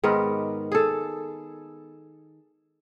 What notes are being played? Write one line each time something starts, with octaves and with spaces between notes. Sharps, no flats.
G#2 D#3 B3 A#4
G#4 A4